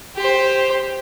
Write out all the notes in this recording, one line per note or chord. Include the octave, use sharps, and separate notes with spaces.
G4 C5